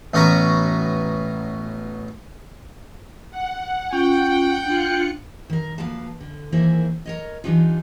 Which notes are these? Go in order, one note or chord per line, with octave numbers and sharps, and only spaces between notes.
A1 B3 C#4 F#4 B4 A#5
F#5
C#4 F4 G5
D4 F4 F#6 C#7
D#3 A#4
D2 F3 A#3 B4 F5 A5
D3
D#3 E3 A#3 E4 G#4 C5
A#4 C#5 D#5
E3 G3 D4 D#4 F4